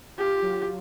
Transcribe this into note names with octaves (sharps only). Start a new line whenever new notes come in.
F4 G4
F#3